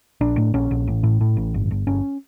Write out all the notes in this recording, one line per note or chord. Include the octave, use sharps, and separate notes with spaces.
A#1 D4
A2
A#1 C#4
A#1
A1
A2
A2
A1
G1
G1
G1 C#4